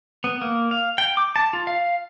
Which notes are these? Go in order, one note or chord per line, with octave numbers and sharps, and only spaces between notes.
B3
A#3
F5
G5
D6
A5
F4
F5